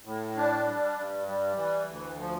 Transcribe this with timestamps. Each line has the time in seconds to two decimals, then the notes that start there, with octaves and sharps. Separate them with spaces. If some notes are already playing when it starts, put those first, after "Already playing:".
0.05 A2
0.37 D4
0.67 G3
0.97 G2
1.28 G3
1.57 E3
1.88 D2
2.19 F3